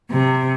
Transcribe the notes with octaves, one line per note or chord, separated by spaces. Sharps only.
C3